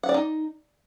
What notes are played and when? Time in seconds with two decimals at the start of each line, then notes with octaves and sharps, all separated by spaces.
0.03 F#5
0.09 D5
0.14 D#4